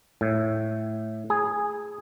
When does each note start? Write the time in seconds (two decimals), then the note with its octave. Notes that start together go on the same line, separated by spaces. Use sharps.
0.21 A2
1.30 G#4